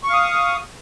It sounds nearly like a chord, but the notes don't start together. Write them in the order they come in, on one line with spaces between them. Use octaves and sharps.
C#6 F5 D#6